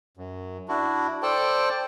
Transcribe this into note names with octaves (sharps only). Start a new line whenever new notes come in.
F#2
D4 E4 F#4
A4 C5 D5 G5 A5